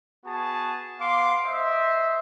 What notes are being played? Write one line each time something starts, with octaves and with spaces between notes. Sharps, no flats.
B3 F#4 G#4 A5
B3 F5 C6 D6
C5 D#5 E5